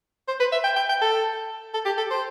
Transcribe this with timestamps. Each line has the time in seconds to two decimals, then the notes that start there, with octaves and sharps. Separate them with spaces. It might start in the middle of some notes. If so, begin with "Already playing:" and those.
0.28 C5
0.40 B4
0.52 E5
0.64 G5
0.76 G5
0.89 G5
1.01 A4
1.74 A4
1.85 G4
1.98 A4
2.11 C5